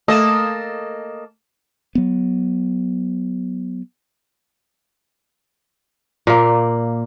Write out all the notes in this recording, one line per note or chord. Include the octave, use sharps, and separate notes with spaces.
A3 A#3 A4 D#5 E7
F#3 B3
A#2 A#3